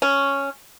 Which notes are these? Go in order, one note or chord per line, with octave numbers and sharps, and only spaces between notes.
C#4